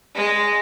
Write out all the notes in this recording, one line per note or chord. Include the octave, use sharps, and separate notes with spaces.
G#3